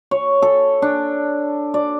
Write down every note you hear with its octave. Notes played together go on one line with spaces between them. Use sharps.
C#5
A4
D4
D5